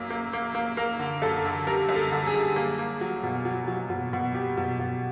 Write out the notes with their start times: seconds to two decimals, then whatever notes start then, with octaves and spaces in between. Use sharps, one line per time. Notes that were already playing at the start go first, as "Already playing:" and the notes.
Already playing: F#2 A#3
0.10 A#3
0.33 A#3
0.55 A#3
0.77 A#3 A#4
0.99 D3
1.22 F#2 A4
1.45 D3
1.67 G3 A#4
1.89 F#2
1.96 A4
2.11 D3
2.26 G#4
2.34 G3
2.56 A#3
2.79 A#3
3.01 F#3
3.23 B2
3.45 F#3
3.68 F#3
3.90 B2
4.13 B2
4.34 F#3 G4
4.57 B2
4.79 B2